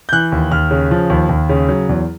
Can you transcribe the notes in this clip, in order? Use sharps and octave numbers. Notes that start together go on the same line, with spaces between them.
G6
E3 F#6
D#2
D#2 F6
C#3
F3
D#2
D#2
C#3
F#3
E2